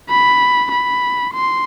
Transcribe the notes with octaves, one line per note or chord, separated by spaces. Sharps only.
B5
B5
C6